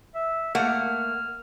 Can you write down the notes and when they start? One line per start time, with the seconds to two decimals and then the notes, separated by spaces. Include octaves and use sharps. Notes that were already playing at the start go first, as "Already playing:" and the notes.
0.15 E5
0.55 A3 A#3 F#5 F6